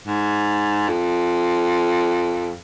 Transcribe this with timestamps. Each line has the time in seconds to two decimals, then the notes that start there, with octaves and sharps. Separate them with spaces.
0.07 G#2
0.88 F2